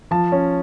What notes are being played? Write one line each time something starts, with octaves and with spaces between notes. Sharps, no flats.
F3 A5
C#4